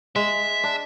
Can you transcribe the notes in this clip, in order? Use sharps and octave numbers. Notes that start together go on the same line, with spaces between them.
G#3 E5
D4